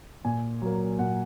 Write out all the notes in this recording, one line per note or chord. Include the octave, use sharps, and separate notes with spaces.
A#2 G#5
F#3 A#3
A#2 F#5